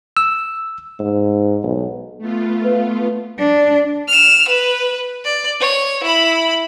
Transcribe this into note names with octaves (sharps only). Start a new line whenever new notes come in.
E6
G#2
B1
A3 B3 F4
B4 F5
D4
F6 E7
B4
D5
C#5
E4 B5